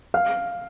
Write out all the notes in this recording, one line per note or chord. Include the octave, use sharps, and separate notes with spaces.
F5 F6